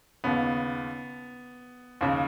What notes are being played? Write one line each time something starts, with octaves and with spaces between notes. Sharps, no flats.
D#2 C#3 B3
D#2 C#3